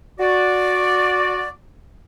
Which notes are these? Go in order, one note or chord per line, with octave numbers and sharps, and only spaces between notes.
F#4 D5